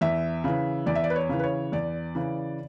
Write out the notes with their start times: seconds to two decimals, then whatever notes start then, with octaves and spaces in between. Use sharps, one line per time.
0.01 E2 E5
0.44 C#3 E3
0.86 E2 D5
0.95 E5
1.04 D5
1.10 B4
1.16 C#5
1.29 C#3 E3
1.39 B4
1.44 C#5
1.72 E2 D5
2.15 C#3 E3